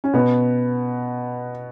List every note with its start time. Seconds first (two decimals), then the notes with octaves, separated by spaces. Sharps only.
0.04 C#4
0.13 B2 B3